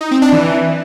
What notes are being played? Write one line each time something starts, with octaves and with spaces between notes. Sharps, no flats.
D#4
C4
D4
E3